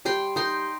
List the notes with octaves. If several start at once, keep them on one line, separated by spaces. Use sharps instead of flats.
G3 G5 C6
D#4 G5 C6